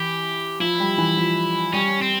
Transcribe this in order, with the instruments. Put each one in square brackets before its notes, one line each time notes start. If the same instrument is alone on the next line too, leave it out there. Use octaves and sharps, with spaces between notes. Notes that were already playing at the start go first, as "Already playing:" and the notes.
Already playing: [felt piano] E3 [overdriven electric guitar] G4
[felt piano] F3 [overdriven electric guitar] E4
[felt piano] G3
E3
F3
[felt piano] G3 [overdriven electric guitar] C#4
[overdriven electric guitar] C4